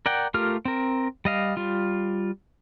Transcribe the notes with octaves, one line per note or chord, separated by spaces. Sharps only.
A#4 D5 F#5 G5
A3 F4 G4 A#4 F6
C4 A#4
G3 D#5 F5
G3 F4